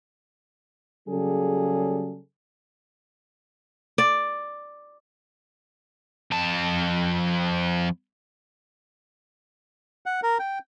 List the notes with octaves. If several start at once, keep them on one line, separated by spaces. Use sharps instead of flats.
C#3 F#3 G3 A#3 G#4 A4
D5
F2 A5
F#5
A#4
G5